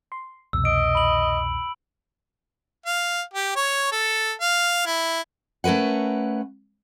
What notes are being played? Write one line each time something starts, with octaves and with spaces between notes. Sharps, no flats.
C6
C2 F2 B2 E6
D#5 D7
B5 F#7
F5
G4
C#5
A4
F5
E4
A3 C#4 A#4 B4 F#5